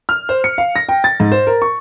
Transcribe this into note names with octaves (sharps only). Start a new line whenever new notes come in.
F6
C5
C#7
F5
A#6
G5
A6
G#2
C5
A#4
C#6